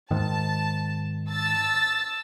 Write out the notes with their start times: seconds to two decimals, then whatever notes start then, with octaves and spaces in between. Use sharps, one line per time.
0.11 G#2 D#3 A5
1.29 A5 E6 A6